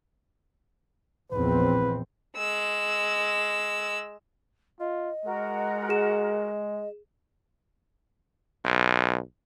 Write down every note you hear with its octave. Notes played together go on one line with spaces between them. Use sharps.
A#1 E2 C4 B4
G#3 E6
F4 D#5
G#3 F#4 A#4
G#4 E7
B1